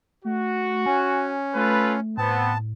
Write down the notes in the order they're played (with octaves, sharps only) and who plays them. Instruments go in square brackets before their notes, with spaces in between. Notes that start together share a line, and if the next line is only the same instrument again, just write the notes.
[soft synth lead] A3 [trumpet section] F#4
[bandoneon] C#4 [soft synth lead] G#5
[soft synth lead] A3 [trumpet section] F4 A4 B4
[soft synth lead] A2 [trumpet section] B3 C4 [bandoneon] A5